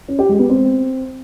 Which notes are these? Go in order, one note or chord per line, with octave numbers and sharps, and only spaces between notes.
C#4
G4
G#3
B3
C4